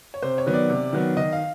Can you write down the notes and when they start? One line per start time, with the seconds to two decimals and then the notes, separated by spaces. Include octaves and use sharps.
0.14 C#5
0.22 C3 C5
0.38 C#5
0.47 D#3 F#3 B3
0.54 D5
0.70 C3
0.93 D#3 F#3 B3
1.17 D#3 D#5
1.33 F5